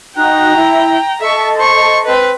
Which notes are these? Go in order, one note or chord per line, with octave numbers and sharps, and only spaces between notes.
D#4 F#4 G5 A#5 F#6
E4
A4 D#5 E5 C#6
C5 C#6
C4 B4